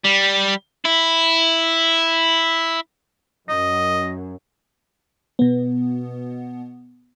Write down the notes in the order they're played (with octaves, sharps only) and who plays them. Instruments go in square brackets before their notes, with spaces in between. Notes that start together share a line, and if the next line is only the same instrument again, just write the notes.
[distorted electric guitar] G3
E4
[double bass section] F#2 [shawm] D#5
[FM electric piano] B2 B3